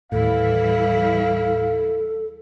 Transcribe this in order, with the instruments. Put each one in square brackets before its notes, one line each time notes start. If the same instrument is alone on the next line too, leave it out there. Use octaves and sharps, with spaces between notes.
[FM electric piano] D#2 A2 [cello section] E3 G3 E4 [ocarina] A4 [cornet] F5